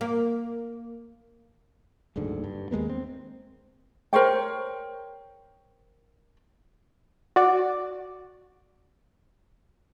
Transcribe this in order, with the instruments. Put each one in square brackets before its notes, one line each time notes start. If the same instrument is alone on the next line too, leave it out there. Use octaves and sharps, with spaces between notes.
[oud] A#3
[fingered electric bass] F#1 D2 G#2 D3
G2
D#2 G#3 A#3 B3
C4
[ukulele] A#4 C5 C#5 G5
[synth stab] F#4 D5